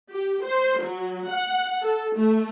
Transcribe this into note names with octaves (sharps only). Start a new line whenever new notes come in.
G4
C5
F#3
F#5
A4
A3